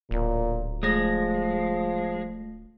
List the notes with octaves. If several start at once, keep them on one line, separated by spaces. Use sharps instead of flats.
D1 A#2
F3 G#3 A3 A#6